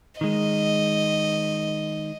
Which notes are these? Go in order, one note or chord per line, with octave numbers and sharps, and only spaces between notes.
D#3 G#3 D#5